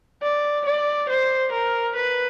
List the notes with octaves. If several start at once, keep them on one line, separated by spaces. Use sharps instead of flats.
D5
D5
C5
A#4
B4